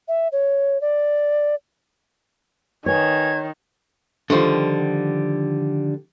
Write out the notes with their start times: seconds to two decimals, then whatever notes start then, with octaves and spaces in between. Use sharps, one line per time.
0.08 E5
0.32 C#5
0.81 D5
2.86 D#3 B4 C#5 G#5 G#6
4.30 D3 D#3 F3 G3